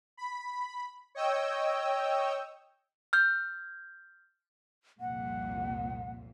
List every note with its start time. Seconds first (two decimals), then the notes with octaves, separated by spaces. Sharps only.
0.17 B5
1.15 C#5 D#5 G5 E6
3.13 F6 G6
5.01 C2 F2 A#2 F#5